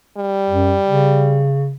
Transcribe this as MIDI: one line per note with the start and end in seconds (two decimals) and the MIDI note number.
0.18 1.51 55
0.50 0.77 42
0.87 1.76 49